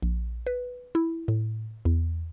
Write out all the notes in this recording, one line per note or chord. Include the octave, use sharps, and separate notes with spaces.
A#1
B4
E4
A2
E2